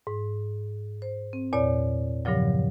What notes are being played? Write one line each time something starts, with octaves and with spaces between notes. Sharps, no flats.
G#2
C5
C4
E2 A#2 C#5 D5
G2 A#2 C#3 F3 F#3